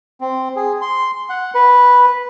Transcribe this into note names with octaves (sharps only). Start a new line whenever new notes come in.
C4
G#4
C6
F#5
B4